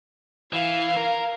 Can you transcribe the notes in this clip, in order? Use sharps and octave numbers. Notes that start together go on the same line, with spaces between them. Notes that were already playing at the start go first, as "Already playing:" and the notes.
E3 F5
A#4